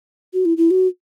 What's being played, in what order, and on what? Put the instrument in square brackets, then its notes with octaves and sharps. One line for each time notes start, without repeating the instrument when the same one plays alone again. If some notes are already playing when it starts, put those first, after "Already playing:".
[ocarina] F#4
E4
E4
F#4